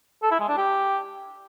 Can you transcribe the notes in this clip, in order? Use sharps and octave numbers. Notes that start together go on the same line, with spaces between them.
A4
E4
G#3
D4
G4